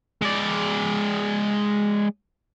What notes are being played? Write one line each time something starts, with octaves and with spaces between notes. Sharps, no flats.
G#3 D5